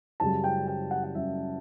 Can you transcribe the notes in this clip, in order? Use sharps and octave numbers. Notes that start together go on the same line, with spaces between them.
F#2 C#3 G3 A5
G5
G5
F#5
F#5
F#2 C#3 G3 E5